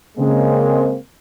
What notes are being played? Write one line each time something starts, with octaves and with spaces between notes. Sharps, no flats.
C#3 G#3 A#3 C4